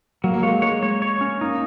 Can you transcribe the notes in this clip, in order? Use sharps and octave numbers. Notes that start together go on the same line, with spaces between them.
F#3 A#3
A#3
G#3 C#5
G#3 C#5
C#5
C#5
C#4
A#3 D#4